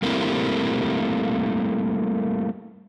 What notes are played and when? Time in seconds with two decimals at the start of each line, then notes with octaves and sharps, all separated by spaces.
0.02 G3 A3 A#3 C4 E4 G4